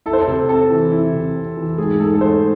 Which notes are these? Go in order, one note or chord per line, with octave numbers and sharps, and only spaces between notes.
E4 A4
C5
A4
C3
C4 A4
E3
E4
C3
C4
E3
G#2 G#4
G#2 A4
A4
A3 C5